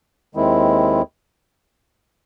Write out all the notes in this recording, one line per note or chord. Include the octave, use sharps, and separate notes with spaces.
D#2 D#3 G#3 C4 E4